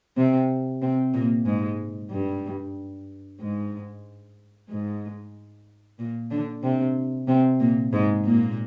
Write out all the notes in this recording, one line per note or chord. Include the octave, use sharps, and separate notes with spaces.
C3 C4
C3 C4
A#2 A#3
G#2 G#3
G2 G3
G#2 G#3
G#2 G#3
A#2 A#3
D3 D4
C3 C4
C3 C4
A#2 A#3
G#2 G#3
A#2 A#3